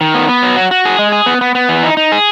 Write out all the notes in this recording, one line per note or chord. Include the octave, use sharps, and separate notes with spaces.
D#3
B3
B3
F#3
F#4
F#4
G#4
G#3
G#4
B3
B3
B3
E3
D#4
D#4
G#4